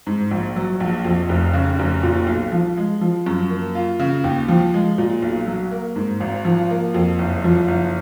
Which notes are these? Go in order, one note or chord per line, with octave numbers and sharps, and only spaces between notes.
G#2
A#1
F#3
A#1
F2
F1
C#3
F1
A#2
B1
F3
G#3
F3
F#2
A#3
F4
C#3
D#2
F3
G#3
A#2
B1
F#3
A#3
G#2
G#1
F3
A#3
F2
F#1
F3
F#1